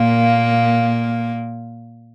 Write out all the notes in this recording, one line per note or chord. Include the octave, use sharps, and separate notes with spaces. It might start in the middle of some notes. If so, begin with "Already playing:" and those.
Already playing: A#2 A#3